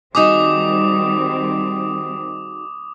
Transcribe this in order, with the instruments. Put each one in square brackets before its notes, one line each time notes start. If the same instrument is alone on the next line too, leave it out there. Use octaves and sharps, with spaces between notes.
[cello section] D#3 G3 C4 [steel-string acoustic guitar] D#4 F#4 G#4 [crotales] D6 D#6